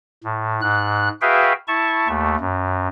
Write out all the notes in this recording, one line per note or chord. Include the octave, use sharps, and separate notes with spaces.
A2
G#2 F#6
F#4 G#4 B4 E5 F5 G5
E4 A5 C#6
D#2 A3
F#2